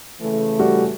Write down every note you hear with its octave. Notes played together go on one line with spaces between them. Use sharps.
C#3 E3 A3
G3 F#4